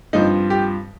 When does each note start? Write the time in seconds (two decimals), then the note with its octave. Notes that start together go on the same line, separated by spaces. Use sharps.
0.13 G2 F3 C4 D#4
0.50 G4